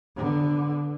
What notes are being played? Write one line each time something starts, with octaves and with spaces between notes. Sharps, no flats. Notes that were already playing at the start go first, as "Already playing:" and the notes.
D3 B3